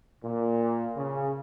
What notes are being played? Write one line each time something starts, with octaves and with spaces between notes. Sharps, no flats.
A#2
C#3